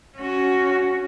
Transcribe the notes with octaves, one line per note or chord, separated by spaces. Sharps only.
C#4 F#4